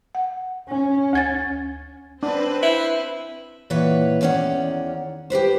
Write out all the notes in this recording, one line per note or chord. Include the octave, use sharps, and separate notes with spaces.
F#5
C#4
D2 G#6 A6
C4 D4 B4
E4
A#2 E3 B4 C#5 F#5
E2 D#3 C#4 D5 F#5
G4 G#4 B4 C5